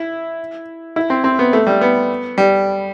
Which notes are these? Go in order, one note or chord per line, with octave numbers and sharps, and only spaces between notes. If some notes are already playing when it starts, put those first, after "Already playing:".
Already playing: E4
E4
C4
C4
B3
A3
G3
B3
G3